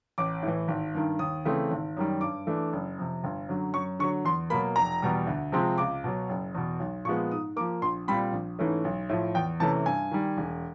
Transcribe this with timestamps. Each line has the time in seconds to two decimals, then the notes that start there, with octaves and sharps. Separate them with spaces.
0.18 A1 D6
0.43 A2 E3
0.68 G#1
0.95 G2 D#3
1.19 D#2 D#6
1.45 C#3 E3 A3 C4
1.71 G#1
1.97 F#2 D#3 G3
2.21 G2 D6
2.47 E3 A3 D4
2.73 F#1
2.99 F2 C3
3.24 G1
3.49 F#2 D3 F#3
3.74 F#2 C#6
3.99 D3 C#6
4.03 F#3
4.25 E2 C6
4.50 B2 F#3 A#3 B5
4.76 F1 A#5
5.02 E2 B2 G3
5.27 D2
5.52 C3 F3 G#3 C4
5.78 C#2 D6
6.04 B2 F#3
6.29 F#1
6.55 E2 B2
6.80 B1
7.05 A#2 F3 G#3 B3 C#6
7.31 G#2 D#6
7.56 A#3 D6
7.60 F3
7.82 A#1 C6
8.08 A#2 G3 C4 B5
8.32 A#1
8.59 G#2 E3 A3 C#4
8.84 B1
9.09 A2 F3
9.35 E2 G5
9.60 C3 E3 A3 C#4 A5
9.86 G2 G#5
10.11 D#3 G3
10.37 E1